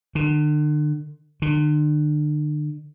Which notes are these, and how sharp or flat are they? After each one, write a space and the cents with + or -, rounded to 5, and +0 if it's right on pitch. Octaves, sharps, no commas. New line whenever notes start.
D3 +40
D3 +40